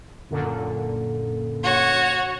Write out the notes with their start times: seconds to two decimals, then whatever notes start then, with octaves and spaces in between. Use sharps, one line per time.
0.30 F#2 A#2 D3
1.63 F#4 C#5